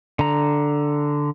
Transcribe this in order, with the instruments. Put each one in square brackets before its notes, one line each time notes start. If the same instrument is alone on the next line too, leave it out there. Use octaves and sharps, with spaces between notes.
[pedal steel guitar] D3 A#5